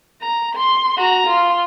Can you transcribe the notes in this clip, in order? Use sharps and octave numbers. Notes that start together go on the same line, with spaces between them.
A#5
C6
F#4 A#5
F4 C6